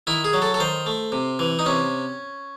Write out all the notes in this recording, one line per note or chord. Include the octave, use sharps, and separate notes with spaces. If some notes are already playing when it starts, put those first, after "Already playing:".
D#3 E4
G#4
F#3
A4
A4
D#3 C5
A3
C3
E3
D#4
C3 C#4